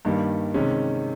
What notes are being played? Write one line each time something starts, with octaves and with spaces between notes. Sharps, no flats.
G2 D#3 G3 A#3
C3 D#3 G#3 C#4